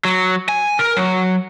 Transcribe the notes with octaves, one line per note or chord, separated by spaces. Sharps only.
F#3
G#5
A#4
F#3